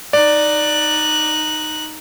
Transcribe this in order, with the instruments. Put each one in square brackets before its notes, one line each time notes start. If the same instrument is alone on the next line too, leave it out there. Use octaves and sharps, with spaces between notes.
[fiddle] D#4 F#6 [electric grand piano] D5